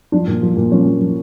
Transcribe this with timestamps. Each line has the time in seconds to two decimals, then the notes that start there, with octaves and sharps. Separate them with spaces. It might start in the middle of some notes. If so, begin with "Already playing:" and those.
0.12 F3 D4
0.28 A#2
0.42 F3
0.57 A#2
0.72 F3 C#4
0.86 A#2
1.01 F3